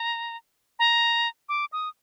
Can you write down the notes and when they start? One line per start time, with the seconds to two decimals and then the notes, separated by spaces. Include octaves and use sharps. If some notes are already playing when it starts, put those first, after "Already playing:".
Already playing: A#5
0.79 A#5
1.49 D6
1.72 D#6